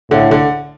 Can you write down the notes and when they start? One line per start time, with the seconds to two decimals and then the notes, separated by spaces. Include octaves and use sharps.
0.11 A2 D3
0.31 D3